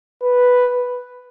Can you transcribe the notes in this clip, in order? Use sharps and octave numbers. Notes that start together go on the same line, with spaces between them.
B4